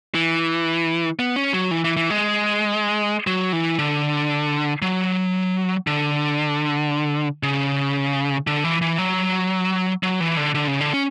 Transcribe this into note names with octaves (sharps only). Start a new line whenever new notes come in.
E3
B3
C#4
F#3
E3
E3
E3
G#3
F#3
E3
D3
F#3
D3
C#3
D3
E3
E3
F#3
F#3
E3
D3
D3
C#3
D3
C#4